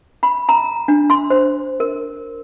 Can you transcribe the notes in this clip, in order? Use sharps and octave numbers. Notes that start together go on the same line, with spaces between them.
B5
A#5
D4
C6
C5
A#4